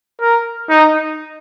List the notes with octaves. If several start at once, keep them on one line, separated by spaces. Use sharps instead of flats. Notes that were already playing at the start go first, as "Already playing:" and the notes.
A#4
D#4